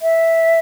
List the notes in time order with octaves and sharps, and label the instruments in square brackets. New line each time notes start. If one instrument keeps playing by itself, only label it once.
[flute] E5